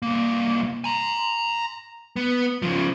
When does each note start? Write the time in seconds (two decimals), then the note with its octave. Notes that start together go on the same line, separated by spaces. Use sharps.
0.02 C2 A#3
0.84 G#5 A#5
2.16 B3
2.62 C#3 F3